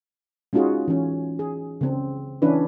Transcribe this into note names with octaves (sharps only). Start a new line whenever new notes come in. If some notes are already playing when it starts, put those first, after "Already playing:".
G#3 C#4 D#4 F4 F#4 G#4
E3 C#4
G#4
C#3 C4
E3 C#4 D4 E4 B4